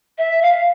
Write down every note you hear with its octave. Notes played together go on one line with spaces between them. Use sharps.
E5
F5